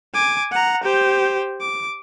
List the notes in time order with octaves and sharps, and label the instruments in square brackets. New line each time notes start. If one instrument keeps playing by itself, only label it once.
[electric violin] G#5 D6
F#5 A#5
G4 C5
D6